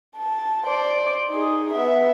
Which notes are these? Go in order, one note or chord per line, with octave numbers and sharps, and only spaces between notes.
A5
C5 D5
D#4 G#4
B3 E5